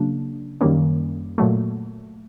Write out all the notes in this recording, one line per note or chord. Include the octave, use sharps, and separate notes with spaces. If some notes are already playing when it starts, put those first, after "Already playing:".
Already playing: C#3 F#3 A#3 D4
F#2 D#3 G3 A#3 C#4
A#2 F#3 A3